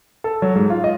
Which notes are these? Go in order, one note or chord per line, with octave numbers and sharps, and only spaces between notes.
A4
F#3
G#2
F4
D#5